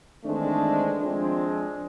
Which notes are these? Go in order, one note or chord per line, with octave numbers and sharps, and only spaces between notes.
D#3 E3 G#3 A3 C4 D4
F3 G#3 C4 D4